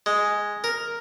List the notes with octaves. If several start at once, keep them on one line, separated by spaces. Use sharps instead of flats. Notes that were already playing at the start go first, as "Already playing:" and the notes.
G#3
A#4